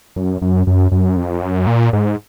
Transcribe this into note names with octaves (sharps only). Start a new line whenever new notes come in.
F#2
F#2
F#2
F#2
F2
F#2
A#2
G#2